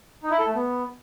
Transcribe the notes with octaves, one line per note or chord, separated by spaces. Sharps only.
D#4
E4
A4
A3
B3